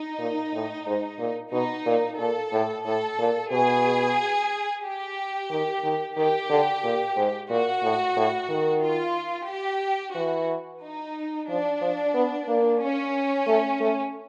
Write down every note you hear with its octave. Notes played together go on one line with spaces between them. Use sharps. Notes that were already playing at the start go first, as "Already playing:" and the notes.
Already playing: D#4
A#2
A2
G#2
A#2
B2 D#4
A#2
A#2 A4
A2
A2 A4
A#2
B2 G#4
G4
D#3
D#3
D#3 G4
D3
A#2
G#2
A#2 F#4
A2
A2
D#3
F4
G4
E3 F#4
D#4
F3 D4
F3
B3
A#3
C#4
A3
A3